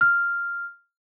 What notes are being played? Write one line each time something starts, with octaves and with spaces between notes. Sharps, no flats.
F6